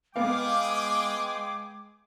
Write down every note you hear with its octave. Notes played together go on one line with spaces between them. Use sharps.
G#3 B3 G#4 F5 G5 D6